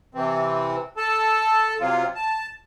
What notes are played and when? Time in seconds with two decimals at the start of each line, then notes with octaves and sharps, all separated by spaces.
0.15 C3 E3 C4
0.97 A4 A5
1.80 C3 F#3 F4
2.15 A5